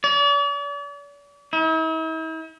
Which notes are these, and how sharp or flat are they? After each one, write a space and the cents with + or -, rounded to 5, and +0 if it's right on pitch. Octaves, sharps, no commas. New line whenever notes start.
D5 -45
E4 -45